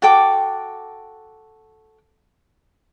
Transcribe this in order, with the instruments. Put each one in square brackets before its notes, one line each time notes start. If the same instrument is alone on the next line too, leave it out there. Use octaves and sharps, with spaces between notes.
[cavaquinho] F#4 A4 G5 D6